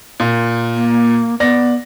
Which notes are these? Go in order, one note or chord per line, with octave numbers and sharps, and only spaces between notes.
A#2
A#3
B3 D5 A#6